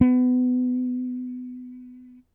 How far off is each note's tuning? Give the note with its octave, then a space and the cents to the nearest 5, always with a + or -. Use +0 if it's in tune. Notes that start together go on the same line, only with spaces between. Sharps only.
B3 +25